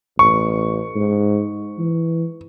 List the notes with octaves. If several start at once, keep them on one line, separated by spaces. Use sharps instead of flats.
A1 C#6
G#2
E3